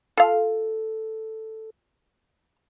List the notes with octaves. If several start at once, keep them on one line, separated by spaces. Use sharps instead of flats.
F4 A4 F5